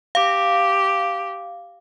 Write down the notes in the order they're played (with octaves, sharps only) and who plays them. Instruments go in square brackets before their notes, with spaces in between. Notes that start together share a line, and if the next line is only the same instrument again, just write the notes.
[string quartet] G4 [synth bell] F5